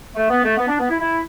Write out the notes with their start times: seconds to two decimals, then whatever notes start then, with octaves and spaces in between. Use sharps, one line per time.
0.15 A3
0.30 B3
0.44 A3
0.57 B3
0.68 D4
0.79 B3
0.89 E4
1.00 E4